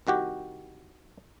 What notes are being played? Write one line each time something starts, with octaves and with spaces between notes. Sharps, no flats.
C2 D#3 F#4 G4